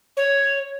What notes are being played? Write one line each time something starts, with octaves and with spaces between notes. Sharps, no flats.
C#5